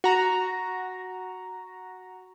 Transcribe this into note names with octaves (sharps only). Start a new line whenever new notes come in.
F#4 A#5